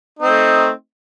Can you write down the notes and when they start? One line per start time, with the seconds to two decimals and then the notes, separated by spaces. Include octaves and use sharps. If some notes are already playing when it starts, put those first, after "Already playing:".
0.19 D#4
0.22 C4
0.25 A3